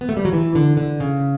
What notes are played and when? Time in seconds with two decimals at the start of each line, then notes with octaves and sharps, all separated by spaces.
0.01 B3
0.09 A3
0.17 G3
0.25 F#3
0.33 E3
0.55 D3
0.77 D3
1.00 C#3